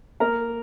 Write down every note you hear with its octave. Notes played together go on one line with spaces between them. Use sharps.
A#3 A#4